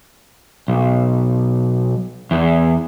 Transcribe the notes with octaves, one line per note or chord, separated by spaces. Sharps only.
B1
E2